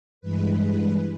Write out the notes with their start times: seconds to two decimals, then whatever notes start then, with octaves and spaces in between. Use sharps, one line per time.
0.21 G2 E3 G#3 B4
0.59 B4